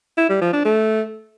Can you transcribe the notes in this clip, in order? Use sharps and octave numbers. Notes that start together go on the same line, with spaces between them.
E4
G3
F3
D4
A3